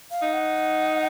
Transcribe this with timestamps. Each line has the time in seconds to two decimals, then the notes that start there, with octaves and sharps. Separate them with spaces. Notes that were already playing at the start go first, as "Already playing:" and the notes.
0.11 F5
0.22 D#4
0.33 F#5